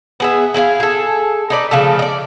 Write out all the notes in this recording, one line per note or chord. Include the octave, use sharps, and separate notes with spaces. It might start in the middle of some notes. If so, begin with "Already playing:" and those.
B3 G#4 E5
E4 G#4 C5 F5
G#4 A4
D#4 B4 D5
C#3 F3 A3 A4
D5 D#5